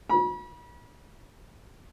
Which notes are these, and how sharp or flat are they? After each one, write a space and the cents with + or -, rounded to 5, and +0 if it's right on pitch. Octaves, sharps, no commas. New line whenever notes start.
B5 -40